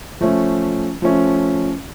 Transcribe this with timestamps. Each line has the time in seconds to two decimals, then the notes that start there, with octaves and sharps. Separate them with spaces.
0.21 F3 A3 C#4
1.02 F3 A3 C#4